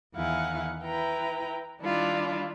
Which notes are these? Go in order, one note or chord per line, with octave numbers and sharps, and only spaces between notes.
E2 D#3 E4 F5 F#5 G#5
E4 B4 G5 A#5
D#3 G3 D4 E4 F4